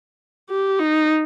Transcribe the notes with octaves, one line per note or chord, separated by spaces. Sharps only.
G4
D#4